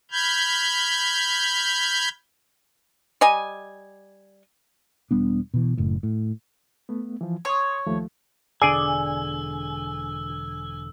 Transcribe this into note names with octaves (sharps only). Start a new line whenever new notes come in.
B5 F6 G6 G#6
G3 D#5 G#5
E1 G3 B3 D4
B2 E3
F#1 A2
A2
A3 B3
E3 F3
C#5 C6 C#6 D#6
D#2 F3 A3
E1 D3 G#4 D5 G#5 E6